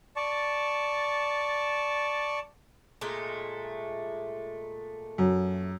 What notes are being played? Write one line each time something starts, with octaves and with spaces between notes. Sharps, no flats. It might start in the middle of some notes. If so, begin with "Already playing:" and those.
D5 A5 C#6
A#2 G#3 A3
F#2